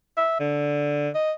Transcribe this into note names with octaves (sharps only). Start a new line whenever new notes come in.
E5
D3
D#5